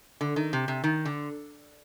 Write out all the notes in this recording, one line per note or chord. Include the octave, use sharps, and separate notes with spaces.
D3
D#3
C3
C3
D#3
D3